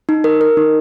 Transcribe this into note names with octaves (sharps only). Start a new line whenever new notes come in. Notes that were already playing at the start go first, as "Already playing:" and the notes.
D#4
A#4
A#4
D#4